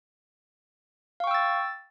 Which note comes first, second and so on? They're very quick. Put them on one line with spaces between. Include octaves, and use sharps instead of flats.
F5 C#6 G5 E6 A6